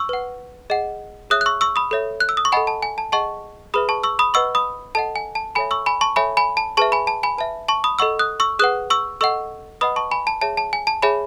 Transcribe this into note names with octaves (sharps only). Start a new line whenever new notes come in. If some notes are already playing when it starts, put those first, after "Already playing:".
Already playing: C#6 E6
B4 F#5
G#4 D#5 F#5
G#4 C#5 E5 D#6 F#6
F#6
C#6 E6
C#6 E6
B5 D#6
A4 C#5 E5
F#6
E6
D#6
C#6
A4 D#5 F#5 G#5 B5
A5
G#5
A5
G#4 D#5 F#5 A5 C#6
G#4 B4 E5 B5 D#6
A5 C#6
C#6 E6
B5 D#6
B4 D#5 F#5 C#6 E6
B5 D#6
A4 D#5 F#5 A5
G#5
A5
A4 C#5 E5 G#5 B5
C#6 E6
G#5 B5
A5 C#6
A4 C#5 E5 G#5 B5
G#5 B5
A5
G#4 B4 E5 A5 C#6
G#5 B5
A5
G#5 B5
B4 E5 A5
A5 C#6
B5 D#6
A4 D#5 F#5 C#6 E6
D#6 F#6
C#6 E6
G#4 B4 F#5 D#6 F#6
C#6 E6
A4 D#5 F#5 C#6 E6
B4 D#5 F#5 B5 D#6
A5 C#6
G#5 B5
A5
G#4 C#5 E5 A5
A5
G#5
A5
G#4 C#5 E5 G#5 B5